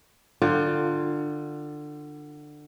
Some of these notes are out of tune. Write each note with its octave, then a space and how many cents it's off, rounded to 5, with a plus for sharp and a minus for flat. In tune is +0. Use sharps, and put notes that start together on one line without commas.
D3 +20 F4 +0 G5 +0